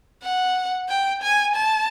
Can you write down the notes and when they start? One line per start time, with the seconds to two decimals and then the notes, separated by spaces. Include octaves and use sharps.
0.23 F#5
0.89 G5
1.22 G#5
1.55 A5